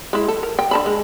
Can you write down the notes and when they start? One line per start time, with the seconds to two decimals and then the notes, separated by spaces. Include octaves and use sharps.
0.13 G#3 E4
0.28 A4
0.43 A#4
0.59 G5
0.71 D3 A5 B5
0.86 G#3